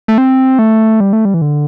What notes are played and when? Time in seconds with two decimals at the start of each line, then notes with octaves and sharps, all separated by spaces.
0.08 A3
0.18 C4
0.59 A3
1.00 G3
1.13 A3
1.25 G3
1.34 E3
1.42 D3